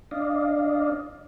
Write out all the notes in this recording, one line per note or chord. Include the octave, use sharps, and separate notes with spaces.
D4 D5 D#5 F5